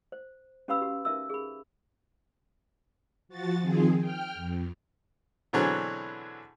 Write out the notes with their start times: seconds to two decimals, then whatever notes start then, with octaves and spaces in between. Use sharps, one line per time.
0.12 C5
0.68 C#4 G4 B4 F5 B5 E6
0.81 F#4 G4
1.05 D#4 A#4 E5 E6
1.30 G#4 B5
3.29 F3 F#4 A6
3.61 D#3 F3 C4 G#4
3.98 G5 F6
4.35 F2
5.53 B2 D3 E3 F#3 C4 G#4